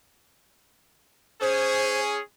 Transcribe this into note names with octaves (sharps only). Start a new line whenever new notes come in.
C#4 G#4 C5